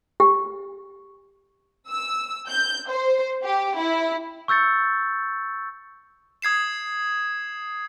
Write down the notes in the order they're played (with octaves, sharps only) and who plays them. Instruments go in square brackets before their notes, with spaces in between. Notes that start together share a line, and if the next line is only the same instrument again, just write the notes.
[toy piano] G4
[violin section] E6
G6
C5
G4
E4
[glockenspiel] C#6 E6 G6 A6 C#7
[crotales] D#6 G#6 C7 E7